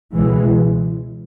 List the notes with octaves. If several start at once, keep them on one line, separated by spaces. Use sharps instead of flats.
C#2 B2 E3 G#3